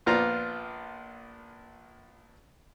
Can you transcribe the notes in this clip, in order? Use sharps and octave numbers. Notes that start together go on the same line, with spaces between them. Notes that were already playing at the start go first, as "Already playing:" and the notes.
A#1 B3 F4 C5 D5 A#5